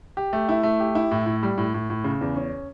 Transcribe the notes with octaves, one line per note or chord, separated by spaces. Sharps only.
G4
A3
E4
A3
G4
E4
A2
A2
G3
A2
A2
A2
C#3
E2
C#4